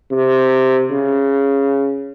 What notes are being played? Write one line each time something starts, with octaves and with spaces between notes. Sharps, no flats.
C3
C#3